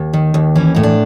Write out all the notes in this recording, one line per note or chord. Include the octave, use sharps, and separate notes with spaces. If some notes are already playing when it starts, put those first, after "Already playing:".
Already playing: D#2
D#3
D#2
E3 C#4
A2 D#4
D4